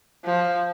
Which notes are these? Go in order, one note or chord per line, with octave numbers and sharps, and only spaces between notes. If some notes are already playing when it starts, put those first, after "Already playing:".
F3